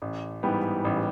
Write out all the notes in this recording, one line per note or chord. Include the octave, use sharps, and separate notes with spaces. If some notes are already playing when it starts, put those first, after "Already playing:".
A1
G#2 E3 G3 B3
A1